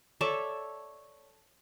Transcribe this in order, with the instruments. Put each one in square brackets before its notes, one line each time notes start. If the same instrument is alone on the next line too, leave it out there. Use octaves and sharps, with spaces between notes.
[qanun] A4 C#5 D5 E5